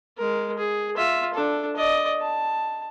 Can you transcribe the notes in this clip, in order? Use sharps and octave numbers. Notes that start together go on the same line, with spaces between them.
G#3 A#4
G#4
F4 E5
D4 A4
D5 D#5
A5